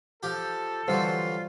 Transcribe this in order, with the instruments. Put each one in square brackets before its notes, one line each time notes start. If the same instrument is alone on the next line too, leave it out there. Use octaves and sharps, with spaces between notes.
[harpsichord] F3 G4 [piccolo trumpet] A4
[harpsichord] D3 E3 F#3 [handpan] G3 C5 [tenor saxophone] F4